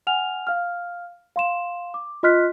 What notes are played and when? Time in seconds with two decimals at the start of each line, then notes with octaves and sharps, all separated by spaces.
0.07 F#5 G#5 F6 F7
0.47 F5 F6
1.36 F5 C6 E7
1.94 D6
2.23 F4 D#5 C6 F6 F#6 B6